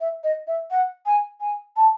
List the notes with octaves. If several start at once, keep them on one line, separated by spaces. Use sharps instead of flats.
E5
D#5
E5
F#5
G#5
G#5
A5